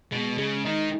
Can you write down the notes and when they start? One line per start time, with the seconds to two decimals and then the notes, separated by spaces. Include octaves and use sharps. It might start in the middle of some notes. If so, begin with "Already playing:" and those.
0.12 B2 G#3
0.38 C#3 G#3
0.65 D#3 D#4